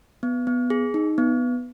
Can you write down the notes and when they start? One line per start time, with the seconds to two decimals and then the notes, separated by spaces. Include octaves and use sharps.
0.23 B3
0.47 B3
0.70 G#4
0.94 D#4
1.18 B3